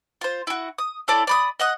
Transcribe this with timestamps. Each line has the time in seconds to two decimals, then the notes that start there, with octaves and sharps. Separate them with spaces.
0.21 F4 C5
0.47 E4 F#4
0.79 D#6
1.08 E4 A4 C#5 D5
1.27 D5 B5 D#6
1.60 D#5 F#5 D#6